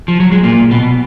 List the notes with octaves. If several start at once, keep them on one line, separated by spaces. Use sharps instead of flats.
F3
F#3
G#3
A#2 A#3
B2 B3